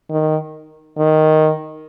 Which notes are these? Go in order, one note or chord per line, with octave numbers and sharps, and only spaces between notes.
D#3
D#3